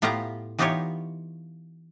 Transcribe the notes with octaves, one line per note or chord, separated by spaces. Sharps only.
A2 B3 F4 G4 F5 A#5
E3 B3 D#4 F4 G4 C#5